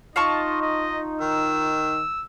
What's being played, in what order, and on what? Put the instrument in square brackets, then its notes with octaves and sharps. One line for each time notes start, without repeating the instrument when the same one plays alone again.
[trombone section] D#4 [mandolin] F4 A5 C#6 [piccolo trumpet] D#5
[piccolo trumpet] D#5
[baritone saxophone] D#3 [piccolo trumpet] E6